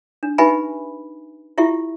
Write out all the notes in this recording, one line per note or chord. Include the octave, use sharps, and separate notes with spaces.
D4
D#4 G4 B4 E5 G#5 B5
E4 F4 G4 E5